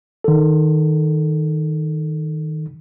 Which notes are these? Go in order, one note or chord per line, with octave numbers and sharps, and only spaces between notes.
D#3 A4